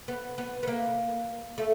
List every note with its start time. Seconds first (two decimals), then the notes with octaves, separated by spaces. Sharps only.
0.08 B3
0.38 B3
0.63 B3
0.67 A#3
1.58 A3